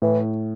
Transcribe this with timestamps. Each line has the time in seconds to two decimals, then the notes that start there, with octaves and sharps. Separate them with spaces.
0.02 A2 E3